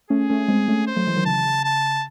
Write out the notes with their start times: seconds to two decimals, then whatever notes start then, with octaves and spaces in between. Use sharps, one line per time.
0.10 A3 C#4 G#4
0.30 A3 C#4
0.40 C#4
0.48 G#3 C4
0.68 A3 C#4
0.87 C5
0.96 F#3 A3
1.07 E3 G#3
1.16 D#3 F#3
1.25 C#3 E3 A5
1.45 C#3
1.64 A5